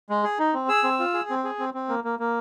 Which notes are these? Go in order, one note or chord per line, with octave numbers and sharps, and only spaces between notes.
G#3
G#4
D#4
C4
G#4 E6
C4
F4
G#4
C4
G#4
C4
C4
A#3
A#3
A#3